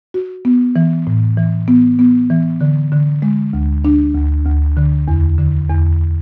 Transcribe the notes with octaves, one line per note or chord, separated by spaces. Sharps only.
F#4
B3
E3
A2
E3
B3
B3
E3
D3
D3
G#3
D2
D4
D2
D2
D3
E2
D3
E2